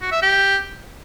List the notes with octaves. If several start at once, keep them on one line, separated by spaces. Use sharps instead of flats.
F#4
E5
G4